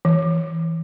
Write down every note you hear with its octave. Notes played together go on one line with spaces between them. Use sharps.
E3